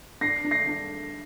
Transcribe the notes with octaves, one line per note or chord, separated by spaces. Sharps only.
D4 A#6 C7
D4
A#6 C7
D4